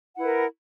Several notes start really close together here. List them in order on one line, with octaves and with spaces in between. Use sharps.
F#5 E4 B4 A#4